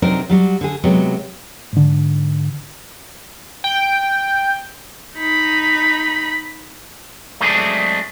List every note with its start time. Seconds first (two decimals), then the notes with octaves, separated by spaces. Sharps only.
0.02 C3 F#3 C4 D4 D#4 A#4
0.29 F#3 G3 F#4
0.61 D3 G#4
0.84 C3 F#3 G#3 B3
1.73 G#2 D3
3.64 G5
5.16 D#4 B5
7.41 F#3 G#3 A3 C4 D4 G#4